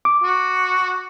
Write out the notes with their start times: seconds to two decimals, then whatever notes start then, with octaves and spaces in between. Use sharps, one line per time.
0.05 D6
0.23 F#4